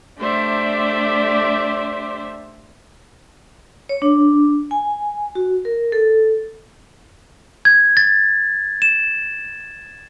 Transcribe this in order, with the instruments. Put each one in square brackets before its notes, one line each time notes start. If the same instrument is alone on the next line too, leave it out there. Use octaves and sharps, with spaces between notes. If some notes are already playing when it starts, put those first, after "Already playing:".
[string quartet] A3 D4 G4 C5 D5 E5
[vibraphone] C#5
D4
G#5
F#4
A#4
A4
[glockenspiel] G#6
A6
E7